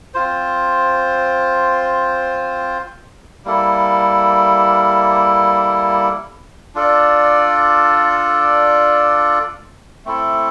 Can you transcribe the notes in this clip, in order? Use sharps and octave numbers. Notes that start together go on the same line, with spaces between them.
C4 F4 C5
G3 A#3 E4 A4
D4 F4 A4 D5
A3 C4 E4 A4